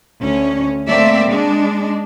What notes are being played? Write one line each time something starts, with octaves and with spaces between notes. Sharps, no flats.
D2 C#4
A3 A#3 C4 D5 E5
G#3 D4